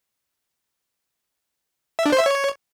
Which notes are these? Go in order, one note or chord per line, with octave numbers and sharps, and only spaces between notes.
E5
D4
C5
E5
C#5